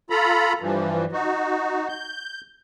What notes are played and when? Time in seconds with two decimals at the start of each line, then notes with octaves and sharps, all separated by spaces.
0.10 F4 A4 A#5 B5
0.61 G2 E3 F3
1.12 D#4 F#4
1.89 G6